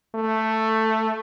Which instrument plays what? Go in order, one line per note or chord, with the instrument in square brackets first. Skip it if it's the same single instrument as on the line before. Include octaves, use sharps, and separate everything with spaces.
[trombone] A3